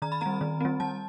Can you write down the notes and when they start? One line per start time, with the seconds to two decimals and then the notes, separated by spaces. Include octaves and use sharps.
0.02 D#3 A#5
0.12 B5
0.21 G3 C4 A#5
0.41 D#3
0.61 G3 C4
0.80 G3 A5